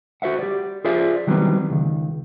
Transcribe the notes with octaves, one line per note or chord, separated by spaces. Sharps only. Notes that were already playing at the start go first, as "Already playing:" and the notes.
F#4 C5 E5 F#5
G4 D5
F4 G#4 C5 D5 E5
D#3 E3 F#3 G3 B3 C4
C#2 D#3